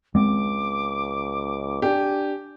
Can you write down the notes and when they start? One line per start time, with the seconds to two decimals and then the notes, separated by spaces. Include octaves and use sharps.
0.15 C#2 G#3 C4 D6
1.82 D4 G4 G#5